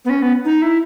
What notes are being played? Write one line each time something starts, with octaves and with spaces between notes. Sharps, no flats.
B3
C#4
B3
D#4
E4